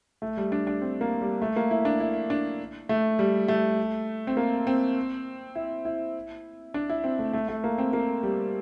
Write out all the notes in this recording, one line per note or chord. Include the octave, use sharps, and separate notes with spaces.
A3
G3
D4
D4
C4
A#3
G3
A3
A#3
E4
D4
E4
D4
A3
G3
A3
C4
A#3
C4
E4
E4
D4
E4
C4
A3
A3
A3
A#3
C4
A#3
G3